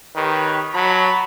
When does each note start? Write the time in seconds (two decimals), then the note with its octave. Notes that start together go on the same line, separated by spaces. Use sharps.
0.16 D#3 G4 B4 C#5
0.74 F#3 A5 B5